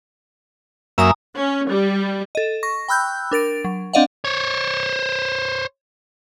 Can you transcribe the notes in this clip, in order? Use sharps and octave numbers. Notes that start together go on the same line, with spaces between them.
F#2 A#3 E5 G#5 A#5 D#6
C#4
G3
A4 D#5
C#6 A#6
G5 B5 E6 F#6 G6
D4 A#4 A6 D7
F#3
C4 D4 D5 D#5 F5 F#5
C5 C#5